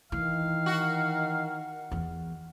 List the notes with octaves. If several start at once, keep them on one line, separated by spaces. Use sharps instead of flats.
D#3 E3 F5
F#4
E2 E3